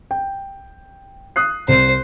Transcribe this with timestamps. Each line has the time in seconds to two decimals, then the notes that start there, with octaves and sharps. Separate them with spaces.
0.11 G5
1.36 D#6 F#6 C7
1.68 C2 C5